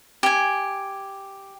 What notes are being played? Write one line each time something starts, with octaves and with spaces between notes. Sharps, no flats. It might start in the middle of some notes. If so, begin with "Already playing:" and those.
G4 G#5